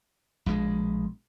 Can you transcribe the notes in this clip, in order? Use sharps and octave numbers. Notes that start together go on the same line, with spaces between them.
A#1 B2 G#3